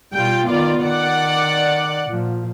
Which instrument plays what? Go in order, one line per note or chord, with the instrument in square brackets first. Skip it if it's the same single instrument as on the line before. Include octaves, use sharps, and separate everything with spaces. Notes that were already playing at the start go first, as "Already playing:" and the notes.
[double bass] B2 G3 [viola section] F4 G5
[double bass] D#3 B3 [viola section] F4 D5
[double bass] D#3 [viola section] D5 F#5
[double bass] A#2 F3